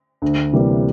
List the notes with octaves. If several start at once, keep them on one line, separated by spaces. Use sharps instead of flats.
D2
C3 E3 G3 A#3